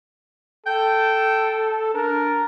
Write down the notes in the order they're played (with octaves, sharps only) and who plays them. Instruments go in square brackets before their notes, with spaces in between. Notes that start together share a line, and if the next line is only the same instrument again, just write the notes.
[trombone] A4 [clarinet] G5
[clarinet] D4 [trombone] A#4